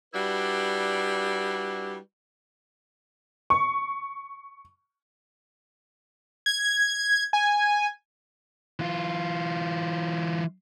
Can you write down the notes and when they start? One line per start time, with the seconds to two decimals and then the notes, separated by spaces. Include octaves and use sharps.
0.14 G3 D4 E4 F#4 B4
3.50 C#6
6.46 G#6
7.33 G#5
8.79 E3 F4